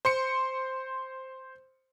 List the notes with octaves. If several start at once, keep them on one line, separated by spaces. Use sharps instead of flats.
C5 C6 C#7